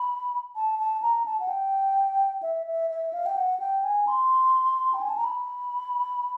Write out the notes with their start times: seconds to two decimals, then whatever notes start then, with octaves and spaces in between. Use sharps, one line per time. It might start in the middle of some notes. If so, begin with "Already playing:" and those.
Already playing: B5
0.56 A5
0.79 A5
1.02 A#5
1.26 A5
1.40 F#5
1.48 G5
2.43 E5
2.67 E5
2.90 E5
3.13 F5
3.26 G5
3.37 F#5
3.60 G5
3.84 G#5
4.07 C6
4.94 G5
5.01 G#5
5.09 A5
5.17 A#5
5.24 B5